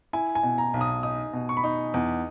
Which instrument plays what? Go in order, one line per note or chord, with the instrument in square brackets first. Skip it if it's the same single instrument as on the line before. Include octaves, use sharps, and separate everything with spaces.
[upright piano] E4 [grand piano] G#5
[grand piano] G#5
[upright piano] B2
[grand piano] A#5
[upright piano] B1
[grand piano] D#6
[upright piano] D#4 [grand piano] D#6
[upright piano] B2
[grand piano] C#6
B5
[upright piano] D#4 [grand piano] C#6
[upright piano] E2 [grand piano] D#6